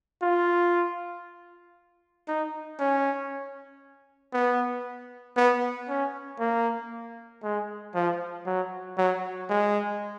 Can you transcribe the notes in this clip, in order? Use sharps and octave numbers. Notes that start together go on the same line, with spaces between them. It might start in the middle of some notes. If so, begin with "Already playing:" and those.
F4
D#4
C#4
B3
B3
C#4
A#3
G#3
F3
F#3
F#3
G#3